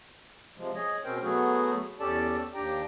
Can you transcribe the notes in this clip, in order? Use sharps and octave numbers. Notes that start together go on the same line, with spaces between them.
C3 F3 G#3
G#4 C#5 D#5
B2 C4 C#4 A#4 C5 G5
F#3 A3 B3 F#4 G#4
E2 C#4 G4 A4 D5 A5
D#2 D4 G4 G5 A#5